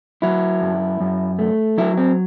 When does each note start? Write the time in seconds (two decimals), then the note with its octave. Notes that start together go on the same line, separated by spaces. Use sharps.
0.22 F#3 E4
0.62 F#2
1.01 F#2
1.39 A3
1.78 F#3 E4
1.97 C4